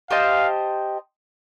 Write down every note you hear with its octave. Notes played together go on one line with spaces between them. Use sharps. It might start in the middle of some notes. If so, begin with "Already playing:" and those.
G4 C5 D#5 F5 A5